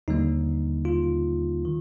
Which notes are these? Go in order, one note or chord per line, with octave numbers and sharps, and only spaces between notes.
D#2 D3 G3 A#3 D#4
F4
D#3